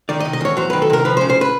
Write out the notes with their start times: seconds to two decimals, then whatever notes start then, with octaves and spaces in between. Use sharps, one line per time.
0.09 D#3 D5
0.20 D#5
0.25 C3
0.33 D#5
0.41 E2 C#5
0.57 F#3 C5
0.70 D#3 B4
0.82 A4
0.90 C3 A#4
1.05 F3 B4
1.17 C5
1.21 C#3
1.30 C5
1.41 B4